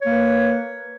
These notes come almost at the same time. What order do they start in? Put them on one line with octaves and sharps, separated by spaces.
C#5 A#3 B4